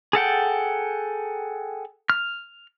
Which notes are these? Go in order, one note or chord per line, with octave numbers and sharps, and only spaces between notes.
G#4 A4 F#5 G5
F6